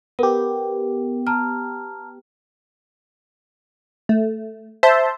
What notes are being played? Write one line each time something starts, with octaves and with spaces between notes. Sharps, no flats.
B3 G4 A#4
A5 A#5 F6
A3
C5 E5 A5 C6